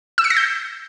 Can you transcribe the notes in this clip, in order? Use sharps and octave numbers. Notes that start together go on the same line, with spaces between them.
E6
C#7
A#6
G6